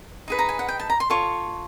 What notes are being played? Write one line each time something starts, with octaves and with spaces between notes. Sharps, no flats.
D#4 G#4 B4
A#5
G#5
F#5
G5
A5
A#5
C6
F4 A4 C#5 C#6